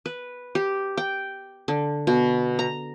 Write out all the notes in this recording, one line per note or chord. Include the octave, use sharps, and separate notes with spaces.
B4
G4
G5
D3
B2
A#5